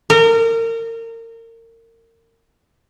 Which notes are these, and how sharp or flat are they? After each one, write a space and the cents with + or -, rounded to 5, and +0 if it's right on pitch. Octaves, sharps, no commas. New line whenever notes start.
A#4 -30